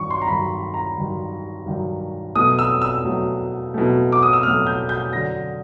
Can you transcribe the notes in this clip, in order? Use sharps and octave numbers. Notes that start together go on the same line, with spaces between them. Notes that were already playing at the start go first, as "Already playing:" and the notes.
Already playing: G2 D#3 F#3 C#6
C6
A#5
G2 D#3 F#3 B5
A#5
G2 D#3 F#3
G2 D#3 F#3
B2 F#3 A3 D#6
E6
E6
B2 F#3 A3
B2 F#3 A3
D6
D#6
E6
B2 F#3 A3 F6
G6
G6
F#2 D3 F#3 A#6